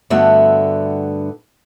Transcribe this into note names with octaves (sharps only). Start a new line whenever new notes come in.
G2 D3 A3 B3 F#4 E5